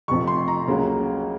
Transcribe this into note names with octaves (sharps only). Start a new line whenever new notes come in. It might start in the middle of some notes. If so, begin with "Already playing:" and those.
F1 F2 C3 F3 C#6
C6
A#5
C#2 C#3 F#3 A#3 C#4